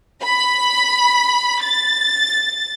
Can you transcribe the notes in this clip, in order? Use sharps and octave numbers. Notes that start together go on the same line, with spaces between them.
B5
A6